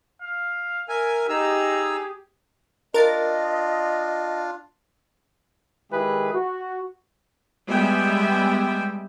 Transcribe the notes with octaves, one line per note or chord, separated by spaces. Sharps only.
F5
A#4 E5 G#5
D#4 G4 G#4 A#5 E6
D4 F4 A#4 D#5 A6
D#3 G#3 E4 G4 G#4 B4
F#4
G3 G#3 B3 E5 G5 G#5